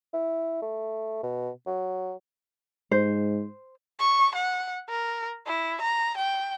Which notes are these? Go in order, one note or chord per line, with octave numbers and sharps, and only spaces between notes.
E4
A3
B2
F#3
G#2 C5
C#6
F#5
A#4
E4
A#5
G5